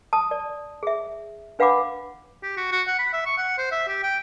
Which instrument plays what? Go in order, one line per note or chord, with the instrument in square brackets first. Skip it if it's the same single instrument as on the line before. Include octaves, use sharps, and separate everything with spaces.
[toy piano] A5 D#6
D5
G#4 E5
D4 B4 F5 F#5 B5 D6
[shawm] G4
F#4
F#4
F#5
B5
E5
C#6
F#5
C5
E5
G4
G5